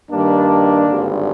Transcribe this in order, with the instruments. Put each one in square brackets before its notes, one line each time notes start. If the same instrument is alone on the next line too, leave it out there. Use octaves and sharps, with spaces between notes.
[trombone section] G2 D#3 G3 A#3 D4
G#1 G2 D3 G3